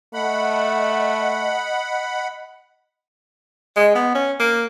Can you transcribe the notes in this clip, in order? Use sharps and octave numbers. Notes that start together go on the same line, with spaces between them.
A3 D#5 F#5 B5
G#3
B3
C#4
A#3